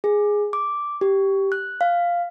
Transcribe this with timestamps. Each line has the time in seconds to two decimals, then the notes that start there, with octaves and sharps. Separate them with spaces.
0.04 G#4
0.53 D6
1.01 G4
1.52 F#6
1.81 F5